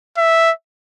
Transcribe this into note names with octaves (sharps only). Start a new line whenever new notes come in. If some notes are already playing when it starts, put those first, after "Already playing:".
E5